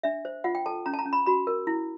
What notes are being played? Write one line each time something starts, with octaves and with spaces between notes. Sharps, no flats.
D4 E5
C5
F4 F#5
G5
A4 A5
C#4 A#5
A5
A#5
C#4
B5
F#4 B5
A#4
E4